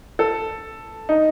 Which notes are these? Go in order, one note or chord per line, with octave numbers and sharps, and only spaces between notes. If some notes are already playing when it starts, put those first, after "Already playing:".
A4
D#4